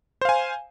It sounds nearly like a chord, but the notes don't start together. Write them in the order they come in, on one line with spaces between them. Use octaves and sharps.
C5 F5 G#5